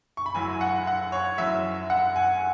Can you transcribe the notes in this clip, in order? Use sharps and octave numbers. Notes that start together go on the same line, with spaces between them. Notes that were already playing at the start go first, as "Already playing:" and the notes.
C#6
B5
F#1 F#2 F#3 E4 G#5
F#5
F#5
C#5
F#1 F#2 F#3 C#4 E4 E5
F#5
G#5